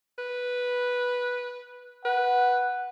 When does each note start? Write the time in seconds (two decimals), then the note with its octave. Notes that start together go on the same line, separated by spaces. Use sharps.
0.18 B4
2.05 B4 F#5